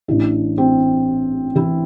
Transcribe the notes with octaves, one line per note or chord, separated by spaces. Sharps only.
A1 A2 E3 D4
C4
E3 E4